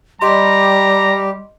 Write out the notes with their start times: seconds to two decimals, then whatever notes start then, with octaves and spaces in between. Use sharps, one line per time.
0.21 G3 G4 D#5 A#5 C6